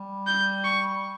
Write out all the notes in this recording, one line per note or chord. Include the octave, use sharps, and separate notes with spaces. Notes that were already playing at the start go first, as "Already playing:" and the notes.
Already playing: G3
G6
C#6